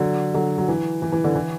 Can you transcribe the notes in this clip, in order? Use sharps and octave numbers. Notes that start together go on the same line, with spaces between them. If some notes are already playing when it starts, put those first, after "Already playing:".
Already playing: D3 F#3
D3 F#3
F#3
E3
E3
E3
D3
E3